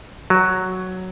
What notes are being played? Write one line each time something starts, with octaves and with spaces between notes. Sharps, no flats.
F#3